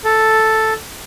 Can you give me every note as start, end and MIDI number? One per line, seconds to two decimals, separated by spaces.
0.05 0.74 69